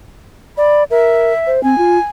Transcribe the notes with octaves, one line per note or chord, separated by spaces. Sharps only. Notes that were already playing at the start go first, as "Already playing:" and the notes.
D5 B5
A#4 E5
C5
C4 G#5
F4